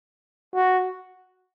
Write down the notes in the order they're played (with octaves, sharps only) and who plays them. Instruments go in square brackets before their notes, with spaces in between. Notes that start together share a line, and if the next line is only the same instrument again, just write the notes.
[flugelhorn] F#4